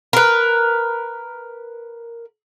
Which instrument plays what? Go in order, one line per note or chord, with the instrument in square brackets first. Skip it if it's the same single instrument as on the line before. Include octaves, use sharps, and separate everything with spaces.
[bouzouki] A#4 B4